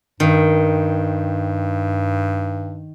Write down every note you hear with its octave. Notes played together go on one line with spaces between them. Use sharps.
G2 D#3